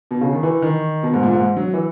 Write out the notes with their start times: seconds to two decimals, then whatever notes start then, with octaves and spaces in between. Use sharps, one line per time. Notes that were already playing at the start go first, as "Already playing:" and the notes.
0.11 B2
0.21 C#3
0.33 D#3
0.43 E3
0.62 D#3
1.03 B2
1.14 G#2
1.23 A#2
1.33 G#2
1.57 F#3
1.74 E3